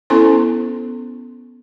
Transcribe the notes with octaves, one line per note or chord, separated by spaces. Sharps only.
B3 C#4 E4 A4 C5 C6